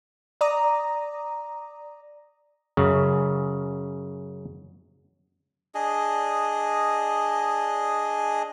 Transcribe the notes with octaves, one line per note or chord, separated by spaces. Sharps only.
D5 A#5 D#6
F#2 C#3
D4 G#4 D#5